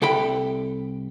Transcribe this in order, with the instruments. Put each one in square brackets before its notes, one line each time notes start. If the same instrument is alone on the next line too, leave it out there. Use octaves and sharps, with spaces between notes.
[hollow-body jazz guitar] C2 A4 G5 B5